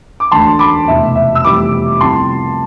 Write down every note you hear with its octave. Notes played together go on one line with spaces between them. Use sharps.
D6
E1 D2 D3 A3 A5 C6
B5 D6
F1 E2 B2 B3 E5
E5
E6
F1 F2 E3 G3 B3 B5 D6
C2 C3 F3 B3 A5 C6